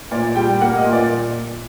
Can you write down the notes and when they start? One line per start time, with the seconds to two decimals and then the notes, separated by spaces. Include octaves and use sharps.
0.11 A#2 D5
0.35 G3 G5
0.61 A#3 F#5
0.77 D#5
0.85 A#2
0.93 D5